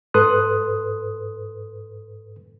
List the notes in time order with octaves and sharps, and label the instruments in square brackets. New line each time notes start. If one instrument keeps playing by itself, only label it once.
[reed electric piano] G#2 A4 B4 C6 D#6 F#6